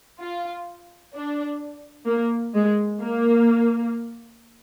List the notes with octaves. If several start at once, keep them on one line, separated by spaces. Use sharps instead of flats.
F4
D4
A#3
G#3
A#3